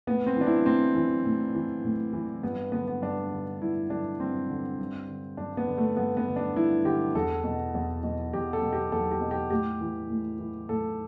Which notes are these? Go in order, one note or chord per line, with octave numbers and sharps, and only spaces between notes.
A2 B3
C4
E3 D4
E4
A2 C4
E3
A2
E3
A2
E3
G2 B3
D3 B3
B3
G2 D4
D3
G2 E4
D3 D4
G2 C4
D3
G2
D3
G2 D4
B3
D3
A3
G2 B3
B3
D3
D4
G2 E4
D3 G4
E2 A4
B2
E2
B2
E2 G4
A4
B2
G4
E2 A4
G4
B2
G4
A2 G4
E3
A2
E3
A2 A4